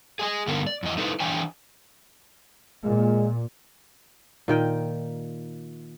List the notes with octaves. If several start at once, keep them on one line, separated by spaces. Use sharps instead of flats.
G#4 D#5 G#5
G2 D3 B3 D4 D#4 A#4
D5
F2 E3 D#5
D#4 E4 A4 B4 C5
E3 D4 C5 D5 G5 G#5
A#2 G#3
A#2 D#3 G5